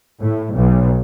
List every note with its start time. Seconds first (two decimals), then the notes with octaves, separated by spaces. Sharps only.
0.21 A2
0.56 B1